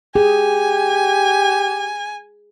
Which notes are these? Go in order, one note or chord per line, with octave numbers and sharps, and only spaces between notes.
G4 G#4 G#5